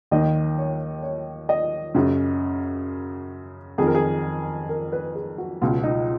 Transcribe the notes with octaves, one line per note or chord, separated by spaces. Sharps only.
D#2 D#3 D#5
C#5
C#5
D#5
F#2 C#3
F2 D#3 G#4
A#4
G#4
A#4
B4
G#4
F#4
C#2 B2 F4
D#4